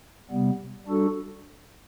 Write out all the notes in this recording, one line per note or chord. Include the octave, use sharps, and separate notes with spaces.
C3 G3 B3
G3 D4 F#4 A4